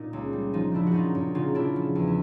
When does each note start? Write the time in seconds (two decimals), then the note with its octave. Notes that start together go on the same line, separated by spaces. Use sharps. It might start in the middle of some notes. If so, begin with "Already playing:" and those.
Already playing: A#2 D#4
0.13 C#2
0.33 G3
0.53 F3 D#4
0.72 C#3 D4 E4
0.87 F#4
0.92 F#2 D#4 F4
1.15 F#2
1.35 C#3 D#4 F4
1.55 C#3 D4 E4
1.76 F3
1.95 E2
2.07 E4